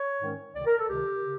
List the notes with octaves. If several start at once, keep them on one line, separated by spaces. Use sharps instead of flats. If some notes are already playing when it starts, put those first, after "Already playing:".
Already playing: C#5
G#2 D#3 G#3 C#4
C#2 C3 D#3 D5
A#4
A4
C#2 C3 D#3 G4
C#3